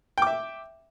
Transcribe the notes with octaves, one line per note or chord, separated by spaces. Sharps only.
E5 G5 D6